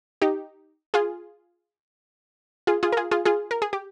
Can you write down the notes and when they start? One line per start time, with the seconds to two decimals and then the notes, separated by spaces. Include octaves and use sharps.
0.22 D#4 G4
0.94 F4 G#4
2.67 F4 G#4
2.83 F4 G#4
2.92 A#4
2.97 F4 G#4
3.11 F4 G#4
3.25 F4 G#4
3.51 A#4
3.62 G#4
3.73 G4